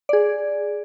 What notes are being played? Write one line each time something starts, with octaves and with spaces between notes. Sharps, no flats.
G#4 D5